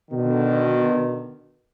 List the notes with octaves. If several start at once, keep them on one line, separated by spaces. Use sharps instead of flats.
B2 D3 D#3